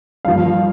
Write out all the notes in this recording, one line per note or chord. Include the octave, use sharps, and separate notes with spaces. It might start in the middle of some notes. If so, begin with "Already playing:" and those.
G2 F3 A#3 F5